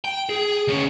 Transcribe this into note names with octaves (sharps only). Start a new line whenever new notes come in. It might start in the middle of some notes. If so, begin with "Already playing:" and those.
G5
G#4
D2 C#4